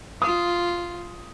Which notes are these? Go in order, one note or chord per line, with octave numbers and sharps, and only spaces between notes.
F4 D#6